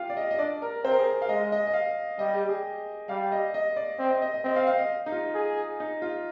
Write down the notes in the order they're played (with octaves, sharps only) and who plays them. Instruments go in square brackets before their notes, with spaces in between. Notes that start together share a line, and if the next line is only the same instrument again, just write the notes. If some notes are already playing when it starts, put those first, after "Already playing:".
Already playing: [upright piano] F4 G4 F5
D5
D#5
D#5
[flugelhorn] D4 [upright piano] D5
[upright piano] A#4
[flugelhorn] C4 [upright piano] C5
[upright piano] A#4
G#4
F5
[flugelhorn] G#3 [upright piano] D#5
[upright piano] D#5
D#5
F5
[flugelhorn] G3 [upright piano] D#5
[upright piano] G4
G#4
[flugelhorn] G3 [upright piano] F5
[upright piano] D#5
D#5
D5
[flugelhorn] C4
[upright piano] D#5
D#5
D#5
[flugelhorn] C4 [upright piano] D#5
[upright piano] F5
F5
D#5
D#4
F4
[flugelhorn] G#4
[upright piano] D#4
F4